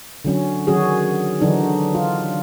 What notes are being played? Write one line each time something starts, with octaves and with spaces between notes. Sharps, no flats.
D3 F#3 C#4
D#3 F#3 C#4 F#4 G#4
D3 E3 F#3 D4 D#4
F4